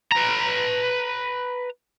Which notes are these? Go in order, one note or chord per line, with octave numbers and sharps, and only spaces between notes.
B4 A#5